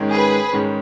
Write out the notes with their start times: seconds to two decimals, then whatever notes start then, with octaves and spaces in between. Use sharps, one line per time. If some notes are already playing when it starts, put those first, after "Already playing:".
Already playing: G#2 D#3 G#3 C#4
0.12 G#4 B4
0.52 G#2 D#3 G#3 C#4